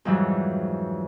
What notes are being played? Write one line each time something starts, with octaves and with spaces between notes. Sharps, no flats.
F2 G#2 E3 F#3 G3